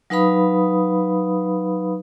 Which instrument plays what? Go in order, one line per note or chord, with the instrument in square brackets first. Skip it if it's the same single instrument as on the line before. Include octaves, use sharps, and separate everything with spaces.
[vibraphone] F#3 D#4 B4 F5 B5 D#6